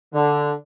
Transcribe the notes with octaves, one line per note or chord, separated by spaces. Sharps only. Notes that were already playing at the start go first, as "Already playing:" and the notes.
D3